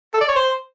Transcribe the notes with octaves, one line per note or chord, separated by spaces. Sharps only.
A4
D5
C#5
C5